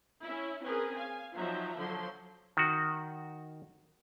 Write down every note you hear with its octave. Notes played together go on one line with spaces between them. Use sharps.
C#4 E4
C4 C#4 G#4 A#4 B4
F5 G#5
F3 F#3 D#4 C5 E5 A#5
D3 F3 F#3 A4 C6
D#3 F#4